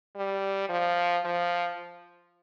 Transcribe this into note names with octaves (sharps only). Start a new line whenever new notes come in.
G3
F3
F3